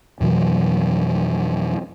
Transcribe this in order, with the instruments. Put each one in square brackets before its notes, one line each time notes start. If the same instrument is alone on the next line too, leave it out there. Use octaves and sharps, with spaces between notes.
[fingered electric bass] F2 B2 E3 F#3